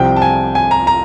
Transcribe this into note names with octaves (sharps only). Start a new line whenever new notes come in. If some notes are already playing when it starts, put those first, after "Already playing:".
Already playing: C2 C3 F3 G5
A5
G#5
G#5
A#5
A#5